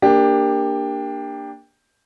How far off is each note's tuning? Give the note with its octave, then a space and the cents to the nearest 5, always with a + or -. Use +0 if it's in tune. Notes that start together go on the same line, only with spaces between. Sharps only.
A#3 +0 D4 +0 G4 +15